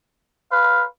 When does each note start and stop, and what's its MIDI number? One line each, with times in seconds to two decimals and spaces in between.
0.52 0.87 71
0.52 0.82 77